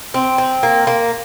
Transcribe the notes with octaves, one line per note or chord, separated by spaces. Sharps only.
C4
C4
A#3
A#3